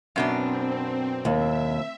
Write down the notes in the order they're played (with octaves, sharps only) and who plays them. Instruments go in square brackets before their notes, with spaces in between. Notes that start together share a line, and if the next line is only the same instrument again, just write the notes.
[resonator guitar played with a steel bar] F#2 B2 D4 [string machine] C4
[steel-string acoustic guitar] D#2 [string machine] E5